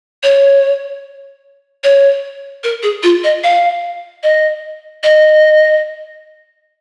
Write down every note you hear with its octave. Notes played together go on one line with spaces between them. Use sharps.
C#5
C#5
A#4
G#4
F4
D#5
F5
D#5
D#5